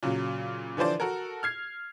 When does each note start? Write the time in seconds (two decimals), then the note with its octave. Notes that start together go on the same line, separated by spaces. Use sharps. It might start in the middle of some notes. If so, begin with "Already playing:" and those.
0.03 A#2 C#3 F#3
0.77 D3 E3 F3 C5 D5
1.00 F#4 A4 A#4
1.43 F6 G#6 C7